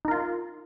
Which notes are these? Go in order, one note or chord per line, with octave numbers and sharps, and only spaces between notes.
D#4 F4 A#4